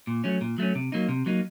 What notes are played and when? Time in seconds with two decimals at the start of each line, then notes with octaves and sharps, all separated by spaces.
0.07 A#2
0.24 F#3 A3 C#4
0.41 A#2
0.58 F#3 A3 C#4
0.75 C3
0.92 F#3 A#3 D#4
1.09 C3
1.26 F#3 A#3 D#4